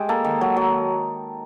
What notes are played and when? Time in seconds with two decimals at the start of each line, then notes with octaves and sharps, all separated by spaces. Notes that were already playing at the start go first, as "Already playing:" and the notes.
Already playing: G#3 G4
0.09 A#3 A4
0.25 D#3
0.41 F#3
0.57 F#3